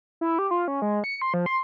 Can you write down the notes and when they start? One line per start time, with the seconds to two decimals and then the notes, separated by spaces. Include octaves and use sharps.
0.21 E4
0.39 G4
0.51 F4
0.68 C#4
0.82 G#3
1.04 C#7
1.22 C6
1.34 F3
1.46 C6